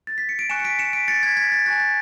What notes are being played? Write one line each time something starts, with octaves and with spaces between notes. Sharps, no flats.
A6
B6
C#7
D7
G#5 C#6 F#6 C#7 E7
C#7
B6 D7
C#7 E7
B6 D7
A6 C#7
G#6 B6
G#6 B6
A6
G#5 C#6 F#6 A6
A6